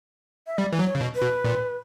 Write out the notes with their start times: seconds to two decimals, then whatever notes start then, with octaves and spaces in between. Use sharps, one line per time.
0.47 E5
0.58 G3 D5
0.73 E3
0.79 F#3
0.86 C#5
0.95 C#3
1.01 B2
1.15 B4
1.22 B2
1.44 A#2